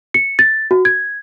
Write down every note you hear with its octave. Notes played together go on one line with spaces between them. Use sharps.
C#7
A6
F#4
G#6